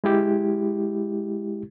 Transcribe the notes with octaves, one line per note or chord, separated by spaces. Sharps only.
G#3 E4 G4